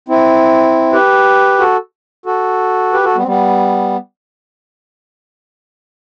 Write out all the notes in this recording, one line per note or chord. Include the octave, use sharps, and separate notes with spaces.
C4 E4
G4 B4
F#4 A4
F#4 A4
G4 B4
F#4 A4
G3 B3
C4
G3 B3